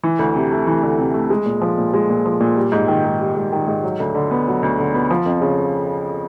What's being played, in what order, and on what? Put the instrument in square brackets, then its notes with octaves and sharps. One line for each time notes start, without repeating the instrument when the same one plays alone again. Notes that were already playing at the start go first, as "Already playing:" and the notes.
[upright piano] E3
D2
C3
A3
E3
D2
C3
A3
G#3
A#2
F3
A#2
G#3
A#2
F3
A#2
G3
G#2
D#3
G#2
G3
G#2
D#3
G#2
F#3
D2
D3
B3
F#3
D2
D3
B3
F3
F2
C#3